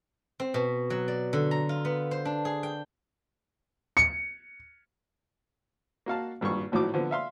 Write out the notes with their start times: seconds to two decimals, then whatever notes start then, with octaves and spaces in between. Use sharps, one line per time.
0.40 C4
0.54 B2
0.90 F#3
1.08 D5
1.33 D3
1.51 A#5
1.69 F4
1.85 B3
2.11 C5
2.25 D4
2.45 G#4
2.63 G5
3.97 C#7
6.06 A#3 F#4 F5 A5
6.41 G#1 G2 A#2 C#6
6.72 G#1 A2 F3 F#3 F#4 D6
6.94 D3 F3 B3
7.11 E5 F5 C6